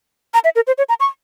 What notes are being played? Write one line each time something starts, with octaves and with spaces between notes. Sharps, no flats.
A#5
E5
A#4
C5
C#5
A#5
C#6